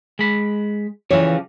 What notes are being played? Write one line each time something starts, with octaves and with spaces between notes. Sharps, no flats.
G#3 B5
C#3 E3 F3 G4 C#5